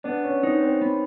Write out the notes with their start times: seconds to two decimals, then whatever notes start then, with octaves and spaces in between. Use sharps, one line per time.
0.04 B3 D4
0.24 C#4
0.43 C4 D#4
0.63 C4
0.81 B3